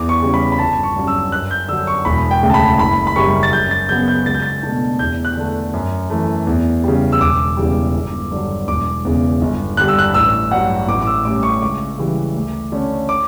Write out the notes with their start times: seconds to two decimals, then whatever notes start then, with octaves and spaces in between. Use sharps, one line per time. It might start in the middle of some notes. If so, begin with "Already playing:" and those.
Already playing: E2 D6
0.09 C#6
0.22 C#3 G3 C#4
0.34 B5
0.52 B5
0.59 G1 A5
0.83 C#6
0.96 G2 F#3 C#4
1.07 E6
1.32 F#2 F#6
1.51 G6
1.69 D3 F#3 E6
1.87 C#6
2.05 E1 B5
2.31 G5
2.43 D2 C#3
2.50 A5
2.54 B5
2.79 F#1 B5
3.07 B5
3.16 F#2 C#3 G3 C#6
3.43 A6
3.53 F#2 G6
3.71 A6
3.89 C#3 F#3 B3 G6
4.08 G6
4.26 C#2 A6
4.35 G6
4.42 A6
4.63 B2 A3 D4
4.99 E2 G6
5.25 F#6
5.37 D3 A3
5.74 F#2
6.10 E3 A3
6.47 E2
6.84 C#3 G3
7.12 E6
7.20 E1 D6
7.57 E2 C#3 E3 G3
7.94 G1
8.31 G2 D3 F#3
8.68 E1 D6
9.05 E2 C#3
9.41 G1
9.77 G2 D3 G3 F#6
9.88 E6
9.99 F#6
10.14 A1 E6
10.51 G2 F#3 F#5
10.88 A1 D6
11.02 D6
11.07 E6
11.25 A2 G3 C#4 D6
11.43 C#6
11.62 C#2 D6
11.98 C#3 E3 G3
12.35 D2
12.72 D3 A3 C#4
13.09 D6